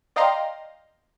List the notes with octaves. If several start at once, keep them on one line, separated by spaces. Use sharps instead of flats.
D5 D#5 F5 G5 A#5 C6